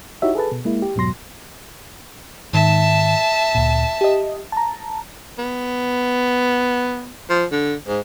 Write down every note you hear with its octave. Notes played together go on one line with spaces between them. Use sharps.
D#4 E4 F#4 G4 C#5 E5
G#4 A4 B4 A5
B2
G#3 A#3 E4
G4
E2 G#2 B2 F#3 C6 A#6
G#2 D#3 E5 A5
D2 A#2
G4 D#5
A5 A#5
B3
F3
D3
G#2